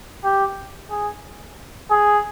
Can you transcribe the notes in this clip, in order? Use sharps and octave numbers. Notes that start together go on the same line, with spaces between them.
G4
G#4
G#4